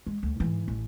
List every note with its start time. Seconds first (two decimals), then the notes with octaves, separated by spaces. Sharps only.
0.06 G#3
0.23 D2
0.40 G#2 E3
0.68 A1